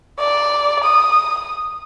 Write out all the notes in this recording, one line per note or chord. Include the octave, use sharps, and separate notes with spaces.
D5
D#6